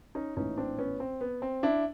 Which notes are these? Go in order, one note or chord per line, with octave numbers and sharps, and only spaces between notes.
C#4 D#4
A#1 A2 E3 C#4 D#4
C4 D4
B3 C#4
C4
B3
C4
D4 E4